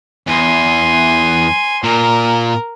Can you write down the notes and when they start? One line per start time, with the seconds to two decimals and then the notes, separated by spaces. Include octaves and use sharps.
0.27 E2 G#5 C6
1.83 A#2 A#4